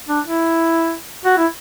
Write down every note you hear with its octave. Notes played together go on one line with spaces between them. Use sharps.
D4
E4
F#4
E4